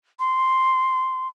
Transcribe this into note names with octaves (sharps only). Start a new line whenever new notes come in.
C6